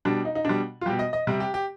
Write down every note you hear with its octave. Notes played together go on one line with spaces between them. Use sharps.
B2 G3 D4
D#4
D#4
B2 G3 D4
F4
B2 G3 G4
D#5
D#5
C3 G3
G4
G4